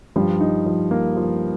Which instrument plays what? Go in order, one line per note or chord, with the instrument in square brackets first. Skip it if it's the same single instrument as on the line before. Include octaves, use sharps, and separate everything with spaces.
[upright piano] G2 G3 [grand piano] F3
[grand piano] D#4
F3
A#3
F3